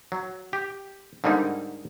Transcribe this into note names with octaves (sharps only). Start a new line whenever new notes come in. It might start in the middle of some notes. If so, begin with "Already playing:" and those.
F#3
G4
G#2 D3 G3 A#3 D#4